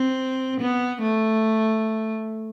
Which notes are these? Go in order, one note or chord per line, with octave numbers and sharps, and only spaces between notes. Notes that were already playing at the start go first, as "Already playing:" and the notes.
Already playing: C4
B3
A3